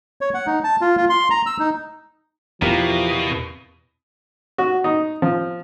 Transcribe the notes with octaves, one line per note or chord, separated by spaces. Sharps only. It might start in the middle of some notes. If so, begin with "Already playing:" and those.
C#5
F#5
D#4
A5
F4
F4
C6
A#5
E6
D#4
E2 B2 E3 F3 G4 A#4 F5
F#4
D#4
F3